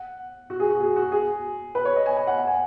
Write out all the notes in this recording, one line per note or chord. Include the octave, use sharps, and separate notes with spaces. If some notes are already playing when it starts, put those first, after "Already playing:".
Already playing: F#5
F#4
G#4
F#4
G#4
F#4
G#4
B4
C#5
D#5
G#5
G#5
F#5
F#5
G#5